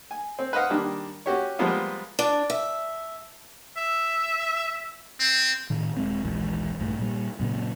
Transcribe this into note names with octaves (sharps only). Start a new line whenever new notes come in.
G#5
C4
B4 C5 D#5 F5 F#5
D#3 G3 A#3 D4
C#4 F#4 G4 C#5
F3 G3 G#3 A#3 B3 F4
D4
E5
E5
C4
A2 D#3
D#1 G#3 C4
D#1 A#1 E3 G#3
A#1 G2 A3
A#2 G3
F#2 A#2 C#3